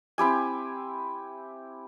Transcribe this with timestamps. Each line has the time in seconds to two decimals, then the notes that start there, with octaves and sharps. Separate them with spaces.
0.18 C4 E4 G4 G#5